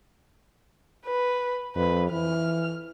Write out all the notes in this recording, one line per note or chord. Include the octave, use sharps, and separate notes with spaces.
B4
F2 B4
E3 F6